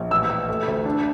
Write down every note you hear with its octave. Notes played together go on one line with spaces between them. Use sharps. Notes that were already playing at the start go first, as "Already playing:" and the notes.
Already playing: A#1
A1 E6
A1
A3
D2
D4